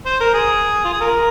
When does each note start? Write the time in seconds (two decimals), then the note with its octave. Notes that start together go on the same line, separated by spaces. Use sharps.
0.06 C5
0.21 A#4
0.34 G#4
0.85 F4
0.93 G#4
1.01 F4 A#4